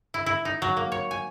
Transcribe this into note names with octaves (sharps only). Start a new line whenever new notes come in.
E4
E4
D#4
F#3
A#3
C#5
G#5